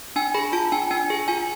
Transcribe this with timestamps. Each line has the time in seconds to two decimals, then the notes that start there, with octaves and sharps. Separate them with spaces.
0.16 D4 G#5
0.34 G#4 B5
0.53 F4 A5
0.72 D4 G#5
0.91 D4 G#5
1.10 G#4
1.28 F4 G#5